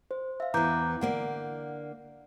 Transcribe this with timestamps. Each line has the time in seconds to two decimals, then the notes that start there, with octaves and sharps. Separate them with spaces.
0.11 C5
0.40 E5 F5
0.54 E2 E3 A#5 D6 G6
1.01 D3 A#3 D5 F#5